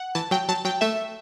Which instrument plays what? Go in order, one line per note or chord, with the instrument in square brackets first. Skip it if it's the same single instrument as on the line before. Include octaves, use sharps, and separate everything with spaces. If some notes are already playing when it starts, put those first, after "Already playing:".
Already playing: [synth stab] F#5
[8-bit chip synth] E3 [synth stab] A5
[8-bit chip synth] F#3 [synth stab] G5
[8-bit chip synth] F#3 [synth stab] A5
[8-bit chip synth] F#3 [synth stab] G5
[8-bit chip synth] A3 [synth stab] E5